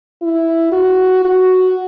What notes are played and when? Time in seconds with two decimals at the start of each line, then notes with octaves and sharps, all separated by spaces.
0.22 E4
0.72 F#4
1.25 F#4